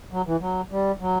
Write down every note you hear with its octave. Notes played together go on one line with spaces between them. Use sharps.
F#3
E3
F#3
G3
F#3